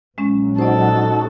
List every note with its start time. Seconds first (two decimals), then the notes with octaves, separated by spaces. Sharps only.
0.18 A#1 A#2 F#3 G#3 C#4
0.58 D#4 F#4 A4 C5 D5